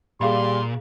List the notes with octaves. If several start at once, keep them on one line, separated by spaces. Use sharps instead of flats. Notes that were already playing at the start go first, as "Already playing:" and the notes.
A#2 G3 G#4 F5 B5 C6